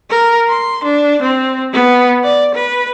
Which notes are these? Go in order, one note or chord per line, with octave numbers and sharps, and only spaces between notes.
A#4
C6
D4
C4
B3
D5
B4